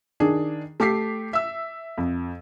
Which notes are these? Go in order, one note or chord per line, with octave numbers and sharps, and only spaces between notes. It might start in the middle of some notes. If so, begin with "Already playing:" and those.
D#3 D4 G#4
A3 G4 D6 B6 C7
E5 E6
F2